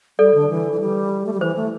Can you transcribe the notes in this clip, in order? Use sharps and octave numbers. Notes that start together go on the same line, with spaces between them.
G3 A4 D5
D3
E3
E3
G3
A3
G3
E3 C5
A3